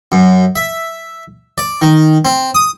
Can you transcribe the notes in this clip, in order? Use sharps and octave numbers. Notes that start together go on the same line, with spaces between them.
F#2
E5
D5
D#3
C4
D#6